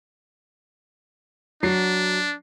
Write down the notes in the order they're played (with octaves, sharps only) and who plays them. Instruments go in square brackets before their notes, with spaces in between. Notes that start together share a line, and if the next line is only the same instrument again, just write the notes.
[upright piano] F#3 C7 [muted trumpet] D4